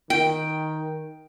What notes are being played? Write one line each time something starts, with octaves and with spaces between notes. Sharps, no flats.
D#3 G5